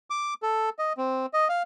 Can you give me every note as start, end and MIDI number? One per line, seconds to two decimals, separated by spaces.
0.10 0.34 86
0.43 0.70 69
0.79 0.93 75
0.97 1.26 60
1.33 1.48 75
1.49 1.63 77